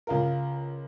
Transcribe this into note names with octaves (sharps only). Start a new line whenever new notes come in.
C#2 F4 A#4